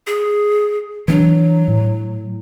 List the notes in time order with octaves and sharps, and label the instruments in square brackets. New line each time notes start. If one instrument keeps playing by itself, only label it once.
[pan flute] G#4
[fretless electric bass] E3 C#4 D4 [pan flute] F#3
[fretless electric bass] A2